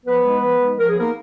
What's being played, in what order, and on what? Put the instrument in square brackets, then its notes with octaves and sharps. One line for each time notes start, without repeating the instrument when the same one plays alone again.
[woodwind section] F3 B3 B4
G#3 D#4
F3
G#3 D#4
F3 A#4
G#4
A#3 B3 D#4 A#4